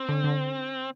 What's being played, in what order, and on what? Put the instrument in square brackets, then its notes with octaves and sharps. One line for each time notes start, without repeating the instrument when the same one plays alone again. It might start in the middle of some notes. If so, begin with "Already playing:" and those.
Already playing: [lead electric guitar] C4
[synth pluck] D3
D3